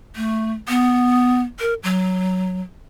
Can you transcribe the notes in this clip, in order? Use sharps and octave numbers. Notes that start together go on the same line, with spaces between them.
A3
B3
A#4
F#3